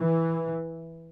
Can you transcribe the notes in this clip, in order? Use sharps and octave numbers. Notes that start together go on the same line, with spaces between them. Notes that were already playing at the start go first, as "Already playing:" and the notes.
Already playing: E3